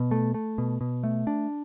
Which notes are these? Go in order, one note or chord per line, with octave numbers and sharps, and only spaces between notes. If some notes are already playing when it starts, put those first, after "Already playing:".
Already playing: B2
A3
A3
B2
B2
A3
D4